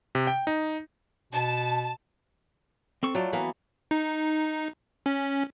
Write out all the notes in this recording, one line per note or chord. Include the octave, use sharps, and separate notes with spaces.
C3
G5
D#4
B2 A5
C4 A4 C#6
F#3 A3 F4 D5
E3 A#3 B3 B4
D#4
C#4